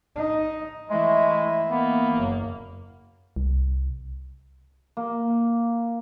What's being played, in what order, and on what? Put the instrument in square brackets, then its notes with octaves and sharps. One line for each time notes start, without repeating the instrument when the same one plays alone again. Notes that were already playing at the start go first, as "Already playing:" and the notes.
[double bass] D#4
[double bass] E3 E4 [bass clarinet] G#3 [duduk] A3
[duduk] A#3 [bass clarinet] B3
[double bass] F#1 F#2
[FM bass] C2
[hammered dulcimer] A#3